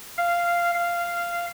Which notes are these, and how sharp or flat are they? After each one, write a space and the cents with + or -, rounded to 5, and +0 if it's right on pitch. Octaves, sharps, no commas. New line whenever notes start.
F5 -10
F5 -10